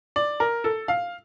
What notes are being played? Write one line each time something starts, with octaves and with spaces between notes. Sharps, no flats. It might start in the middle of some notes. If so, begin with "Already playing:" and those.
D5
A#4
A4
F5